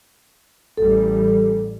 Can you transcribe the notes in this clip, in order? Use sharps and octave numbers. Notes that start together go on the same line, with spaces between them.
A1 G3 A4